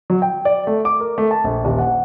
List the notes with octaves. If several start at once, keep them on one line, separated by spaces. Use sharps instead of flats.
F#3
G5
D5
A3
D6
A#4
A3
A5
A#1
D#1
F#5